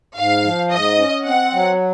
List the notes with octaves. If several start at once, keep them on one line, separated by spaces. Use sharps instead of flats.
G#2 F5
F3
G#2 D#5
C#4
C4 F#5
F#3